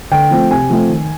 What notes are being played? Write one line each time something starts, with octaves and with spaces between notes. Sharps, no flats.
D3 G5
F3 A3 C4
C3 G#5
F3 A3 C4
D#3